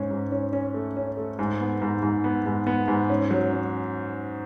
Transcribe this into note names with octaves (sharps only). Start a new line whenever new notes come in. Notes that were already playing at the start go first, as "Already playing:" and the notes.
Already playing: G#2 C#4
G#2
C#4
C#4
A3
C#4
A3
G#2
B3
G#2
G#2
B3
G#2
B3
G#2
C#4
F#3
C#4